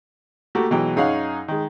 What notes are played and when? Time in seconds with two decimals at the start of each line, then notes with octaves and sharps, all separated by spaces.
0.55 A3 A#3 F#4 G4
0.71 B2 E3 F#3 G#3 G5
0.96 F#2 D#4 G#4 C#5 F5 F#5
1.48 D#3 G#3